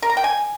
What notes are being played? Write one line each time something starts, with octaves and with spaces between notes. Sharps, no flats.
A#4
A#5
G5
G#5